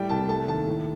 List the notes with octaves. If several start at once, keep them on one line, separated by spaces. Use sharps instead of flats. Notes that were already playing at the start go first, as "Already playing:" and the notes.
Already playing: A2 G3 G5
C2 A5
A3 A5
D#2 A5
A2